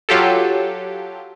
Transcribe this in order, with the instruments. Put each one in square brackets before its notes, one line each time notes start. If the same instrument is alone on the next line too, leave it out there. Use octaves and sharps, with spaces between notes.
[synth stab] F#3 F4 G4 A4